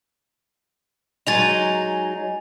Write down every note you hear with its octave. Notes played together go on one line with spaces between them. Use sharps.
F#3 G#3 D#4 G#5 A6 F7